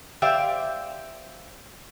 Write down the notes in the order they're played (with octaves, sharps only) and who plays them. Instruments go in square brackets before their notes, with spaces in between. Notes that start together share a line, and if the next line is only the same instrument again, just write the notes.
[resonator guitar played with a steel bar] G4 C5 D5 E5 F5 G5